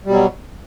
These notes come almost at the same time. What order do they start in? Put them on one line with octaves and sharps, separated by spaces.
G3 B2 F#3